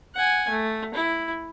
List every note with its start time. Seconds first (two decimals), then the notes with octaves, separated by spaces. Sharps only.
0.16 F#5 G#5
0.50 A3
0.95 E4